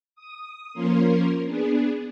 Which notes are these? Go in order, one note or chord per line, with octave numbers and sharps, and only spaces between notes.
D#6
F3 A#3 C#4 A#4 C6
B3 D4 G#4